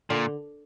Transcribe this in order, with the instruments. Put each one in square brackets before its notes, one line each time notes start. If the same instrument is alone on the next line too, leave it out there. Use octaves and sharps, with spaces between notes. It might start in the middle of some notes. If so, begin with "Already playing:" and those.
[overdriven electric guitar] A#2 [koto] D3